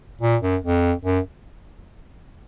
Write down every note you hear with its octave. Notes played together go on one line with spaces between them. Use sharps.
A#2
F#2
F2
F#2